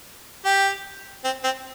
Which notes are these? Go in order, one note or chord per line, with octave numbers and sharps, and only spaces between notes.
G4
C4
C4